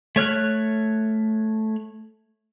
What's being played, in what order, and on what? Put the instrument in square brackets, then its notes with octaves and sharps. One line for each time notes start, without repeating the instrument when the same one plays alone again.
[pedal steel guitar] A3 C#5 F6 F#6